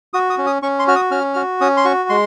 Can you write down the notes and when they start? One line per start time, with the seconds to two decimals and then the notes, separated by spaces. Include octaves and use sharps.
0.14 F#4 D#6
0.30 D#6
0.38 C#4
0.47 D#6
0.62 C#4 C#6
0.79 C6
0.87 F#4 F6
0.96 D#6
1.11 C#4 F6
1.34 F#4 F6
1.61 C#4 D#6
1.77 C6
1.85 F#4 C#6
2.09 G#3 C6